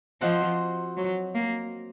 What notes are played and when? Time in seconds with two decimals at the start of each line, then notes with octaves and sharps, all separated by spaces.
0.21 F3 C4 F#4 C5 D#5
0.97 F#3
1.35 A#3